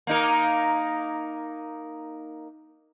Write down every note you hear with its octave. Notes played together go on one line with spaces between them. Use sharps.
A#3 D#4 A#4